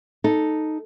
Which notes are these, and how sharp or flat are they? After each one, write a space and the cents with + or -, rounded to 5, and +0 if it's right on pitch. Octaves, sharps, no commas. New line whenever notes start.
D#4 +0 A4 +0